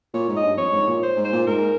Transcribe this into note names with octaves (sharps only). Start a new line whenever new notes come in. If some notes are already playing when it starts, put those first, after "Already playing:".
A#2 C#5
G#2
D#5
G2
F2 C#5
G#2
A#2
C5
G#2
C5
A#2
G#2 A#4